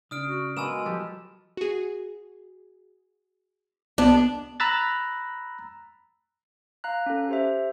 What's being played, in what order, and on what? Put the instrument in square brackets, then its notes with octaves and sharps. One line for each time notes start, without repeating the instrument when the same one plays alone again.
[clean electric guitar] C#3 D4 [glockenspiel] D#6 F6 D7
[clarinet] F#4
[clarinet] G#3 [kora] A#3 B3 F#4 [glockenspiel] G#5 E6 E7
[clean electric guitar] F3 F#3 [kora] G4 A4
[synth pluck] F#4 G#4
[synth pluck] C2 B3 [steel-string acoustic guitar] D4
[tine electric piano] A#5 B5 E6 F#6 A6
[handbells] F5 A#5 F#6
C#4 A4
G4 C5 E5